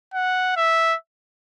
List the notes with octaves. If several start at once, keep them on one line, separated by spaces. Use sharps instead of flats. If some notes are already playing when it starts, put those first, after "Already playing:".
F#5
E5